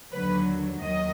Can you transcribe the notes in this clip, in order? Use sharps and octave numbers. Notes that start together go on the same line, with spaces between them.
D#2 D3 F#3 B4
D#2 D#3 F#3 D#5